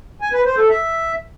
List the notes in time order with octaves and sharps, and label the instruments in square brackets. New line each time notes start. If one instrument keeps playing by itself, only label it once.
[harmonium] G#5
B4
C5
A4
E5